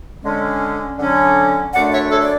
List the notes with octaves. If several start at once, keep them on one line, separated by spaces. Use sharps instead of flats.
D3 G#3 C#4
D3 F#3 C#4
F#2 D3 A3 D4 D5 F#5
C#5 E5
A4 C#5
D5